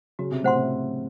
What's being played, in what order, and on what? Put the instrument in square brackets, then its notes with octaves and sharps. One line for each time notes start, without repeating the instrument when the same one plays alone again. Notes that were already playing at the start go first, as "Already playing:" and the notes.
[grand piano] C#3 [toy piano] F#4
[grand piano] C3
[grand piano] A2 [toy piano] C5 F#5 C6
[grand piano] C3